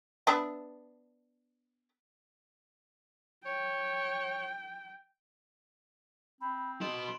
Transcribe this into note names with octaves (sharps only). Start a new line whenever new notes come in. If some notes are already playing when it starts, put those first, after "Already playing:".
B3 D4 E5
C#5 G5
C4 B5
F#4 D#5 C6 D7 E7 F#7